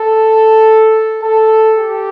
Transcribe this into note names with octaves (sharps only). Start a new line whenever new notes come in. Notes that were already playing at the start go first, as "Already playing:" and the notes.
Already playing: A4
A4
G4